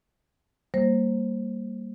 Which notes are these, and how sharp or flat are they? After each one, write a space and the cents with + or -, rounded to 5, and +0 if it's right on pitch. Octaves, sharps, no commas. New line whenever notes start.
G3 +0 A#3 -10 C5 +20